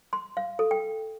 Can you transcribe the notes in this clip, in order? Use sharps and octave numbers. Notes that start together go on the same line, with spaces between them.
C6
F5
A4
G5